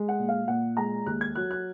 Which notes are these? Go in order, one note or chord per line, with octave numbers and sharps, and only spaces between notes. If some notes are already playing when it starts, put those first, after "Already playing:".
Already playing: G#3
F#5
A#2
F5
A#2 F#5
G#3 A#5
D#2 F#6
G#6
F#3 F#6
F#6